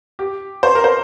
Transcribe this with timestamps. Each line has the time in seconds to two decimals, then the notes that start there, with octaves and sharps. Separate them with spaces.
0.19 G4
0.63 C5
0.75 A#4
0.84 C5